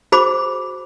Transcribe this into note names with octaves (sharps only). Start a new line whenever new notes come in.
F#4 G#4 C5 B5 D6